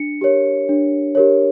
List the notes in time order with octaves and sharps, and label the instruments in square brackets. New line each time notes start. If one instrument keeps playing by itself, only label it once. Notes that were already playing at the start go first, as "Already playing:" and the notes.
Already playing: [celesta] D4 C#7
G4 A#4 C#5
D4
G4 A#4 C#5